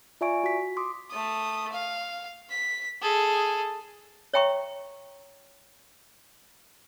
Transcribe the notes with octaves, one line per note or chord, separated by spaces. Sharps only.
F4 D5 E5 G#5 C#6 D7
F#4 B6
C6 D6 D#6
A3 D#6
F5
B6
G#4 A4
C#5 E5 G5 A#5 C#6